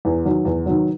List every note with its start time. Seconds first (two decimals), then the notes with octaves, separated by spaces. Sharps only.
0.05 E2
0.25 D#3 F#3
0.45 E2
0.66 D#3 F#3